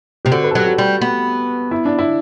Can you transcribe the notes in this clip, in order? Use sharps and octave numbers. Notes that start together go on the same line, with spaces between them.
C3 G4
D3 F#4
B4
A4
F#3 G4
F#4
G3
B3
E4
D4
E4